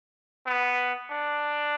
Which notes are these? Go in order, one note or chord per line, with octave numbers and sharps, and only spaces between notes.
B3
D4